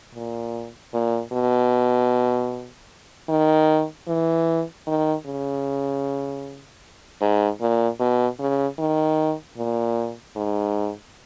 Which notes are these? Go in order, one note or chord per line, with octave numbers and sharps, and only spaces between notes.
A#2
A#2
B2
D#3
E3
D#3
C#3
G#2
A#2
B2
C#3
D#3
A#2
G#2